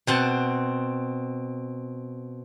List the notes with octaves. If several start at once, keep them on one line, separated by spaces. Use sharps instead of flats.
B2 C4 F#5 A5